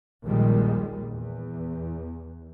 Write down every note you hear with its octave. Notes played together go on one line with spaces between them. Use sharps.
A#1 D#2 A#2 D#3 G3 G#3
E2